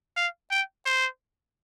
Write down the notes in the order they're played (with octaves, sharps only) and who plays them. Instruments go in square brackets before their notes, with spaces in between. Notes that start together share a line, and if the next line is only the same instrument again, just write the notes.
[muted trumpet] F5
G5
C5